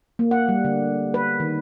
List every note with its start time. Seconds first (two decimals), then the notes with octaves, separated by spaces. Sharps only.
0.19 A#3
0.31 F#5
0.49 G3
0.65 D3
1.14 B4
1.40 D#3